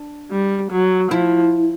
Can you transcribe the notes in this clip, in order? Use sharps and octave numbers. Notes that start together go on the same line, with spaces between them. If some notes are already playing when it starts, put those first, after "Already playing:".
Already playing: D4
G3
F#3
F3 E4